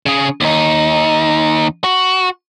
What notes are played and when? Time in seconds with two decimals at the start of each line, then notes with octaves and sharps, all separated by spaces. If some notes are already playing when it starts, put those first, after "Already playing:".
0.06 C#3 G#4
0.41 D#2 D#4
1.84 F#4